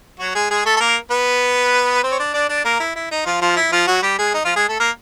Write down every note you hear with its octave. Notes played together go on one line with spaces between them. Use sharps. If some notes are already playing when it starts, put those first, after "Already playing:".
F#3 F#4
G#3 G#4
G#3 G#4
A3 A4
A4
A#3 A#4
B3 B4
C4 C5
C#5
D4 D5
D4 D5
D4 D5
A#3 A#4
E4
E4
D#4
F3 F4
F3 F4
E4
F3 F4
F#3 F#4
G3 G4
G#3 G#4
D#4
F3 F4
G#3 G#4
A3 A4
A#3 A#4